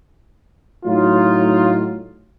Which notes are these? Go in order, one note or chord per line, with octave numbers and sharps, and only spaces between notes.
A2 F#3 D#4 F4